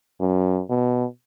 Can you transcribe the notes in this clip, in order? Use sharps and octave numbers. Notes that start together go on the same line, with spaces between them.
F#2
B2